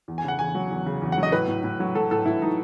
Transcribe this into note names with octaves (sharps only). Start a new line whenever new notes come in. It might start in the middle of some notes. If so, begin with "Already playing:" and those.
E2
G#5
C#3 F#5
E2 G#5
F#3
E2
C#3
E2
F#5
F#3
D#5
A2 B4
A2
A2
F#3
F#3 A4
A2 A4
A2 E4
F#3 D#4